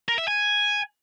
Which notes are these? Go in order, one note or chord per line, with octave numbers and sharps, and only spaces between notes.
A#4
E5
G#5